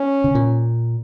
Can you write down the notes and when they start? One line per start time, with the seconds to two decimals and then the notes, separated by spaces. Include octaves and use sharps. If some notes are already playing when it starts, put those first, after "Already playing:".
Already playing: C#4
0.24 C#3
0.35 A#2